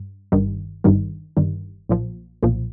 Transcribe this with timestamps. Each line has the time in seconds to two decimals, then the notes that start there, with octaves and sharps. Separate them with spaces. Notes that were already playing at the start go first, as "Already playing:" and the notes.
Already playing: G2
0.32 G1 G2 D#3 G3
0.84 G1 G2 D#3 G3
1.37 G1 G2 D#3 G3
1.89 B1 A#2 F3
2.43 B1 A#2 F3